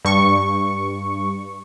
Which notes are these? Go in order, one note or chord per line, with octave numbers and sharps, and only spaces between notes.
G2 C#6